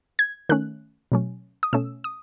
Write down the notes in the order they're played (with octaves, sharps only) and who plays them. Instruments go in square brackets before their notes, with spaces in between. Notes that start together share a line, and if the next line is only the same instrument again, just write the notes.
[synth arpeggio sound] G#6
D#3 A3 C#4 F#6
B2 F#3 A3 C#4
D#6
B2 A3 C#4 E6
D#6